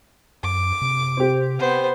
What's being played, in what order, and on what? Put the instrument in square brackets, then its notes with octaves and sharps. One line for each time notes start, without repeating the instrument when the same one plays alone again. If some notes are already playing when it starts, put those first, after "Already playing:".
[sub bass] F#2 [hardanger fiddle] D6
[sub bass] C3
[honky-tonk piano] C4 G4
[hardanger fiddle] B3 C5